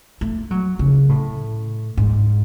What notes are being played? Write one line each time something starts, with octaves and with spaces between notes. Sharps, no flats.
A3
F#3
C#3
A2
G#2